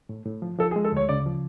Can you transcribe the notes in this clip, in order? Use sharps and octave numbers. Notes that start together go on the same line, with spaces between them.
A2
A2
F3
F3 A4
G#4
G#3
A4
D2 C#5
C#3 D5
F3